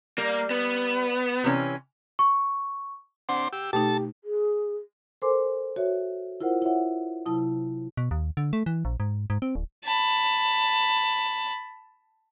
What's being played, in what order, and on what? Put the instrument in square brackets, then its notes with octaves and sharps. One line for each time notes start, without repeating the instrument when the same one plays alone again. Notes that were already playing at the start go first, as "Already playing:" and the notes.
[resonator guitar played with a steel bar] G3 [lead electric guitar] A#3
[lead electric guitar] B3
[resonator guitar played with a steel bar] C3 E3 C#4
[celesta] C#6
[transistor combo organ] C4 D4 C5 [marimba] F#5
[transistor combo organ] G4 E6
[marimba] B2 A3 D#4 [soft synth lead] G4 [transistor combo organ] A4 A5
[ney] G#4
[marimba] A4 A#4 C5 G#5 C6 D6
F#4 C#5 E5
E4 F4 A#4 C5 F#5
E4 C#5 E5 F#5
C3 F#3 E4 A5 D#6
[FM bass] B2
D#2
D3
A3
E3
A#1
G#2
G#2
C4
D1
[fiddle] A5 B5